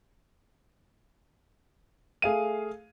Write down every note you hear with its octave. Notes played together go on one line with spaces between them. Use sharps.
A3 G#4 F5 D#7